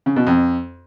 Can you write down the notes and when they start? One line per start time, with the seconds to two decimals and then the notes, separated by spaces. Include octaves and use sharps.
0.06 C#3
0.16 B2
0.27 F2